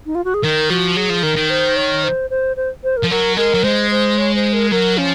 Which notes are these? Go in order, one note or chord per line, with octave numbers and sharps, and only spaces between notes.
D#4
F4
F#4
G#4
D#3 A#4
F3 F#4
F#3 G#4
F3
D#3 A#4
D#3
C5
C#5
C5
C5
C5
C5
A#4
F3
F#3 A#4
G#3 A#4
F#3
G#3 C5
C5
C#5
C5
A#4
F#3 A#4
F3 C#4